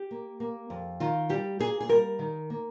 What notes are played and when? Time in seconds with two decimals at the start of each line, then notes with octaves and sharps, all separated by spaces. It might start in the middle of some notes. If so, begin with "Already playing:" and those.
Already playing: G4
0.11 A#3
0.40 A#3
0.70 F2
1.00 D#3 F4
1.29 G3 G4
1.59 A#3 G#4
1.81 G#4
1.89 G3 A#4
2.19 D#3
2.50 A#3